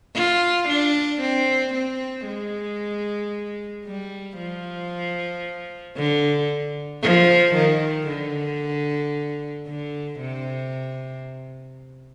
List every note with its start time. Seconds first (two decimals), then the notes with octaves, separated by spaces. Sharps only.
0.15 F4
0.68 D4
1.21 C4
1.74 C4
2.26 G#3
3.85 G3
4.38 F3
5.97 D3
7.03 F3
7.55 D#3
8.08 D3
9.67 D3
10.20 C3